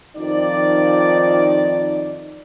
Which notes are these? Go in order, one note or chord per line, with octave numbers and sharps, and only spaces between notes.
F2 D#3 F3 D#4 D5